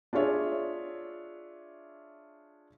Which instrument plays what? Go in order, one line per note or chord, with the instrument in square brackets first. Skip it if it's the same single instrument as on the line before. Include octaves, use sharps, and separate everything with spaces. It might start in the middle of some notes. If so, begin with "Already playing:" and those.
[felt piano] D4 F4 G#4 C#5 E5